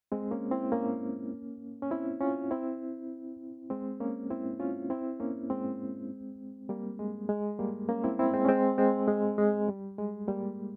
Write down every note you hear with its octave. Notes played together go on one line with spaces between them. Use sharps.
G#3 C4
A#3 C#4
C4 E4
A#3 C#4
C#4
C4 E4
C#4 F4
C4 E4
G#3 C4
A#3 C#4
C4 E4
C#4 F4
C4 E4
A#3 C#4
G#3 C4
G3 A#3
G#3
G#3
G3 A#3
A#3 C#4
C4 E4
C4 E4
G#3 C4
C#4
G#3 C4
G#3 C4
G#3
G#3
G3
G#3
G3 A#3